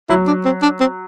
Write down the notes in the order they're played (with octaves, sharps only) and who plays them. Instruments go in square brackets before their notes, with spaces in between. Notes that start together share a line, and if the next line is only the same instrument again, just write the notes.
[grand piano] F#3 [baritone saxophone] E4
[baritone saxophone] D4
C4
D4
C4